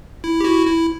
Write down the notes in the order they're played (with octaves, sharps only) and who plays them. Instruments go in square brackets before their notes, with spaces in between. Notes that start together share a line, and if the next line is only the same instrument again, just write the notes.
[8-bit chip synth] E4
G4
E4 F#4
E4